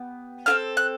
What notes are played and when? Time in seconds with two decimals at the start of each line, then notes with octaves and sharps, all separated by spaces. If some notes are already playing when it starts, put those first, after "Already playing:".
Already playing: B3 G4
0.46 C4 F4 A4 F6
0.77 F#6